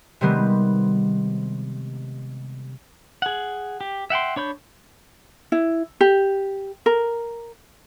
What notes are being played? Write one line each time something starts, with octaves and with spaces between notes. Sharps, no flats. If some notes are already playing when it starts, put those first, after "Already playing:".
C3 D#3 G3 G#3 B3 C4
G#4 F#5
G4
E5 F#5 G5 C6
D4 C#5 B5 G6
E4
G4
A#4